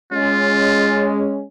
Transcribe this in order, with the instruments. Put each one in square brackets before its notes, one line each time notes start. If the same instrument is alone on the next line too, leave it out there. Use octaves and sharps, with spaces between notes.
[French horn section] G#3 C#4 [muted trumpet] F4